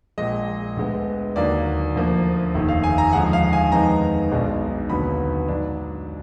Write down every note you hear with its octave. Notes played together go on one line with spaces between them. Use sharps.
A#1 A#2 G#3 D#5
D2 D3 G#3 B3
D#2 D3 F#3 A#3 D4 D5
D2 D3 F3 A#3
F1 D#2 D#3
F5
G#5
A#5
D#2 D3 F3 G#3 F#5
F5
G#5
F2 D#3 G#3 B3 D#4 A#5
B1 B2 G#3 D4
D#2 D3 F#3 B3 B5
G#2 F#3 D4